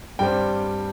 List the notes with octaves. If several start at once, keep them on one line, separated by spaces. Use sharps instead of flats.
G2 G3 C4 G5